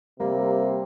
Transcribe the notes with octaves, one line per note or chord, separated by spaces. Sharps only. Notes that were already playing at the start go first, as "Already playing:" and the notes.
C3 G3 A#3